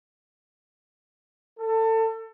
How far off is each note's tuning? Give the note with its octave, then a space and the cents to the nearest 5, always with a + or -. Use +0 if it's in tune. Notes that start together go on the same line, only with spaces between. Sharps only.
A4 +25